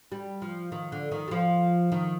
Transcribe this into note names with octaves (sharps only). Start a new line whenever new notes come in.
G3
F3
D#3
D3
D#3
G3
F3
D#3